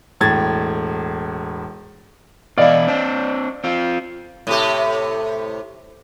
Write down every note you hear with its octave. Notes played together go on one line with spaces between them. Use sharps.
E1 A2 G#6 A6
B2 E3 E4 D5 D#5 F5
C4 D4
C4 F4
A2 C3 G4